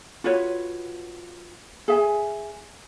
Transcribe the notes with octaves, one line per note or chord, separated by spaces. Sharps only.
F4 F#4 B4 C#5
G#4 E5 G#5